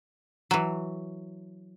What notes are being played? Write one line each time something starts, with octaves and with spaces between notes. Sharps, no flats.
E3 F#3